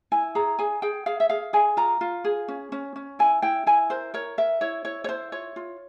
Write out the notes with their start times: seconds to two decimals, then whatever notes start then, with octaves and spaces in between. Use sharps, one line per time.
0.12 E4 G#5
0.35 G#4 A#5
0.59 G#4 G#5
0.82 G#4 G5
1.06 G#4 F5
1.20 E5
1.29 G#4 F5
1.53 G#4 G#5
1.77 F4 A#5
2.01 F4
2.24 G#4
2.48 C#4
2.72 C#4
2.96 C#4
3.19 E4 G#5
3.42 E4 G5
3.66 E4 G#5
3.90 A#4 C5
4.14 A#4 C#5
4.38 A#4 E5
4.61 E4 C#5
4.85 E4 C#5
5.04 C#5
5.09 E4 C5
5.32 F4 C#5
5.56 F4